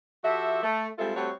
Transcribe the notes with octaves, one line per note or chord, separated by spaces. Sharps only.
F3 F#4 G4 A4 E5
A3
G3 G#3 C4 F4 A4 E5
G3 A3 C4 F#4 C#5